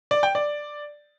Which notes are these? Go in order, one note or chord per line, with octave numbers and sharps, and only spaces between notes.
D5
G5
D5